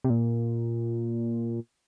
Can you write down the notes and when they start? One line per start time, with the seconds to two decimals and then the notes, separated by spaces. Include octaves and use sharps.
0.04 C3
0.10 A#2